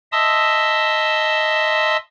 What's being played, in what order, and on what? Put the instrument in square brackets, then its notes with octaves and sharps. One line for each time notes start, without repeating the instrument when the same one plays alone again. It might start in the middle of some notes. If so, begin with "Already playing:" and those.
[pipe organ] D#5 E5 A5 C6 D#6 E6